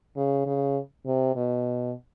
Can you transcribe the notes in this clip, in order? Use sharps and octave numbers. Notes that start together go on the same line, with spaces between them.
C#3
C#3
C3
B2